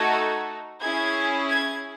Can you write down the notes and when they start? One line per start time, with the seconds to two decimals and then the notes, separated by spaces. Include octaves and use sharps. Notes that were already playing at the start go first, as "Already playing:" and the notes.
Already playing: A3 D#4 F#4 A4 G#6
0.82 C#4 E4 G#4 G#6
1.50 G#6